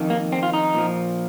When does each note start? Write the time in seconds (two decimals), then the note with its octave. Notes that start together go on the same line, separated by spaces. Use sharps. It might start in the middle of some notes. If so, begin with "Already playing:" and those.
Already playing: F2 D#3
0.10 A#3
0.32 C4
0.43 F4
0.53 D#4
0.75 A#2 F3